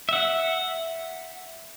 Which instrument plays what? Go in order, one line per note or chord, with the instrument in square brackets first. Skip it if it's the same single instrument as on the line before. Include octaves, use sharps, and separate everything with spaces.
[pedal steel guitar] E5 F#5